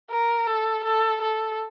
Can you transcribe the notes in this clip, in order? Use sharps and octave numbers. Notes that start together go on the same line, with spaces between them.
A#4
A4
A4
A4